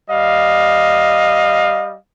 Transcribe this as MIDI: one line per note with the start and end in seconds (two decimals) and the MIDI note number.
0.10 1.97 55
0.10 1.97 75
0.10 1.97 77